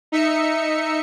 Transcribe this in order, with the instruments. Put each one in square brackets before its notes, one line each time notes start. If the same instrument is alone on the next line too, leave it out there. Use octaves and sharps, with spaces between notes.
[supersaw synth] D#4 E5 C#7